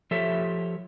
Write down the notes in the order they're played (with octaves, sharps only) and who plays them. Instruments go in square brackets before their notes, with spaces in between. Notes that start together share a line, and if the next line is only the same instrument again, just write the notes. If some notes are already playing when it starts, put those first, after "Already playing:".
[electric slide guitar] F3 G4 A4 C#5 E5